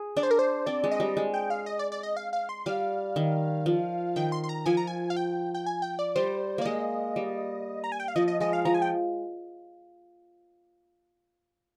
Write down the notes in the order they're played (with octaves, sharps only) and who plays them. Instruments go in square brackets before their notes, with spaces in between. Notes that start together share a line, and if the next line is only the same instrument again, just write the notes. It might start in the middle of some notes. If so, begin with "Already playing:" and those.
Already playing: [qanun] G#4
[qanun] D4 [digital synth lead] D5
[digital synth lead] C5
A#4
C5
[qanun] C4 [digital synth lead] D5
[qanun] G#3
[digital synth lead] D#5
[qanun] G3
G#3
[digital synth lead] G5
F5
D#5
D5
D5
D#5
F5
F5
C6
[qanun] G3 [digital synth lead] F5
[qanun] D#3
F3
[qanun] D#3 [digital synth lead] G5
[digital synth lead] C6
C6
A#5
[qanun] F3 [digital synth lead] G#5
[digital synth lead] A#5
G#5
F5
G5
G5
G#5
G5
D5
[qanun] G3 [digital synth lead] C5
[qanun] A#3 [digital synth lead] D5
[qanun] G#3 [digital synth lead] D#5
[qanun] G3
[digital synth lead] A#5
G#5
G5
F5
[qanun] F3 [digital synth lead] D#5
[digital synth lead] D#5
[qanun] G#3 [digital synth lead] D#5
[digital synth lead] F5
[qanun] F3 [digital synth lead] A#5
[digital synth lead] G#5
G5